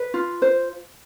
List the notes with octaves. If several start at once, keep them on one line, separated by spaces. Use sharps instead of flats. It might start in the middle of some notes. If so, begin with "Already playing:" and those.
Already playing: B4
F4
C5